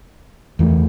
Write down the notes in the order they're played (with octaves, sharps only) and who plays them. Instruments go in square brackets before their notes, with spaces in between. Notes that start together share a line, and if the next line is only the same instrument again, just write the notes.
[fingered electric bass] E2 E3 A3